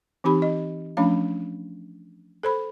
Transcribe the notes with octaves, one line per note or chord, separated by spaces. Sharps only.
E3 C4 D#4 G4 B5
D#5
F3 A3 C#4 D4 F5 B5
A4 C5 B5